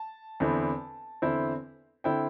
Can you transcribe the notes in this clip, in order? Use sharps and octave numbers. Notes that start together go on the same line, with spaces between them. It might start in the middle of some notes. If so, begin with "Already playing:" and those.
Already playing: A5
E2 D3 C4 E4
E2 D3 C4 E4
D3 C4 E4 G5